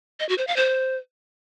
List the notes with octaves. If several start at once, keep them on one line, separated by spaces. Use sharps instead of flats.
D#5
F#4
C5
F5
C5